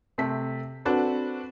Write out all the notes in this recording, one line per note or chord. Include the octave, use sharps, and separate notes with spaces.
C3 A3 B6
C4 D4 F#4 A4 B4